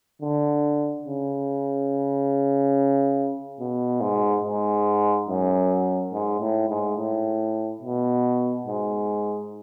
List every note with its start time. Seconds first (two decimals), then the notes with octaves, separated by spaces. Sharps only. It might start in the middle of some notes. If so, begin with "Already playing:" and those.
0.22 D3
1.06 C#3
3.60 B2
4.01 G#2
4.44 G#2
5.28 F#2
6.13 G#2
6.40 A2
6.69 G#2
6.97 A2
7.81 B2
8.66 G#2